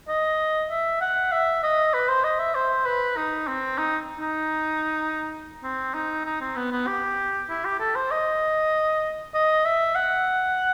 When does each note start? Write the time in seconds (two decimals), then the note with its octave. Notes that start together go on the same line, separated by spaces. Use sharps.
0.08 D#5
0.69 E5
1.01 F#5
1.32 E5
1.63 D#5
1.94 B4
2.08 C5
2.24 D#5
2.39 E5
2.54 C5
2.86 B4
3.17 D#4
3.47 C4
3.78 D#4
4.19 D#4
5.63 C4
5.94 D#4
6.26 D#4
6.41 C4
6.56 B3
6.71 B3
6.87 G4
7.50 E4
7.65 G4
7.80 A4
7.95 C5
8.11 D#5
9.34 D#5
9.65 E5
9.95 F#5